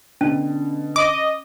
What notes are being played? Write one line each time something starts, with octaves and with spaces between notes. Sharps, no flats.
B2 D3 C#4
D#5 D6